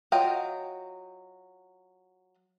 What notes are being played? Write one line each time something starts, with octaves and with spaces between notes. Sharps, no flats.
F#3 F4 D#5 G5